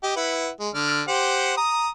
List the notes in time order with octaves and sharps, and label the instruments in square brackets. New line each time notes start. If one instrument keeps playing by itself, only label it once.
[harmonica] G4 D#5
E4 B4 F#5
G#3
D3 D5 F6
G4 C5 F#5
A#5 D#6